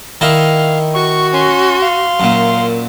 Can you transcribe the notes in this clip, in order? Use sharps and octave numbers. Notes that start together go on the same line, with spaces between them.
D#3 D#4 E4 F5
F#4 C#6
C#4 C6
F5
F#2 A#2